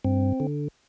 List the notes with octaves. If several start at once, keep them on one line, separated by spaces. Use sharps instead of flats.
G2 C4
D3